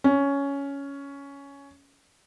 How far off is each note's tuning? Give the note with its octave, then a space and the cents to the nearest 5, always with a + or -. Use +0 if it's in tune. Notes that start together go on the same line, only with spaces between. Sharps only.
C#4 +10